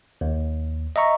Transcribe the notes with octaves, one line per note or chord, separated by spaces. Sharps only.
D#2
D#5 E5 A#5 C#6